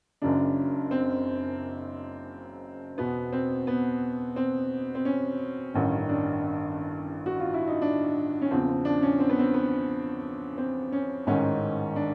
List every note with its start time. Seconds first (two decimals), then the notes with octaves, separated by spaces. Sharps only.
0.22 F#1 F#2 C#3 D4
0.91 C4
2.98 E2 B2 B3
3.33 C4
3.67 B3
4.36 C4
4.95 C4
5.05 C#4
5.74 A1 G2 D#3 C#4
6.09 D4
7.26 F#4
7.40 F4
7.54 E4
7.67 D#4
7.82 D4
8.42 C#4
8.51 E2 C#3 F3 C4
8.68 C4
8.85 D4
9.02 C#4
9.20 C4
9.29 B3
9.39 C4
9.54 B3
10.58 C4
10.92 C#4
11.27 A1 G#2 D#3 C#4
11.96 D4